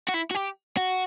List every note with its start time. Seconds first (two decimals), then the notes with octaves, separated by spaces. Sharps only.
0.08 F#4
0.14 E4
0.31 F#4
0.35 G4
0.77 F#4